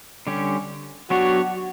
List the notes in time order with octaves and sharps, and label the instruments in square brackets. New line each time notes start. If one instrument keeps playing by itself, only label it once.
[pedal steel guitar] D3 G3 C#4 G4
[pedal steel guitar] F#3 B3 D4 G4 C#5 [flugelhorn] F#4